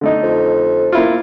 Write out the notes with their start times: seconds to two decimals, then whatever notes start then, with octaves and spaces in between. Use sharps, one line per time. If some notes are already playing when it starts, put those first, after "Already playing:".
0.01 D3 A3 D#4
0.23 F2
0.92 A#3 E4 F4